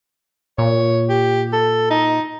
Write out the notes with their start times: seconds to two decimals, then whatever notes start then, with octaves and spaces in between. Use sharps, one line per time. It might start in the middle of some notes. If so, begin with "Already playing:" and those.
0.58 A#2 C#5
1.09 G4
1.53 A4
1.91 D#4